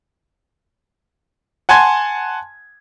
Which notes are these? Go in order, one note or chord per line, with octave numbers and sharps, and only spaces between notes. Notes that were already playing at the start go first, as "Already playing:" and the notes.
F#5 G#5 A5 C6 G#6